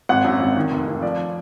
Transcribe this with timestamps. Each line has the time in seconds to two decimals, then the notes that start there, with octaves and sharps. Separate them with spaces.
0.09 G#1 F#5
0.25 F#2
0.40 G#1
0.57 D#3
0.71 F1
0.88 D#3
1.02 F3 D5